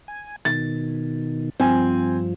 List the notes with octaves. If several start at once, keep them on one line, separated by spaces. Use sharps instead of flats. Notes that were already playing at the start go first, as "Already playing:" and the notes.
G#5
B2 D#3 A6
G2 F3 C4 G#5